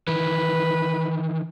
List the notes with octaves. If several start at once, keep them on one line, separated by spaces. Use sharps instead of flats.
D#3 E3 B4